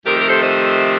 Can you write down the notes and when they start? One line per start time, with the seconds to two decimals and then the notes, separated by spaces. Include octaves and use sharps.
0.05 F2 C3 D#3 A3 G4 A#4
0.17 G4 A#4
0.29 A4 C5
0.42 C5 D#5